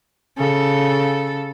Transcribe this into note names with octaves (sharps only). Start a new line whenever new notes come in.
C#3 A4